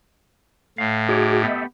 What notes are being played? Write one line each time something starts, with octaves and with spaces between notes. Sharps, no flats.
A2 F5
D#4 F#4 G#4 C#5 D6
A3 B3 G4 D#5 E5